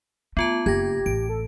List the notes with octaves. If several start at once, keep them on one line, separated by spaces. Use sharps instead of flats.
A3 B3 F4 A5
F#1 G4 G#6 A#6
A1 D7
A4